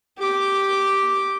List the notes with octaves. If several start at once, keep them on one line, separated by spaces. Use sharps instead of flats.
G4 D6